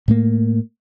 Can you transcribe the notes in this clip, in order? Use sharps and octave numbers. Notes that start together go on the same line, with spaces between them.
A2 A3 A#3